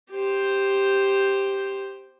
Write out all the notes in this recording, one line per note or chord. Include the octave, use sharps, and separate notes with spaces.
G4 C5